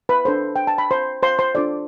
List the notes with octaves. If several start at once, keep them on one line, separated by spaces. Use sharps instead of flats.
B4 B5
D4 A4 C5
G5
A5
B5
C5 C6
C5 C6
C5 C6
D4 F4 A4 C5 D5